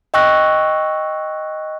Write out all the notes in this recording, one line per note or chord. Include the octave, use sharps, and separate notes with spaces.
D#5 G5 C#6 E6 F#6 A#6